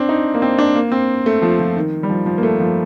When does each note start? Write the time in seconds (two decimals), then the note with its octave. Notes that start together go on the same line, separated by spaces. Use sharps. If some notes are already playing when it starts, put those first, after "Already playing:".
Already playing: C4 D4
0.09 D#4
0.35 A#3
0.42 C4
0.59 D4
0.75 A#3
0.92 C4
1.26 A3
1.42 F3
1.60 F3
1.77 D#3
2.03 G3
2.10 F3
2.26 F3
2.38 A#3
2.43 A3
2.60 F3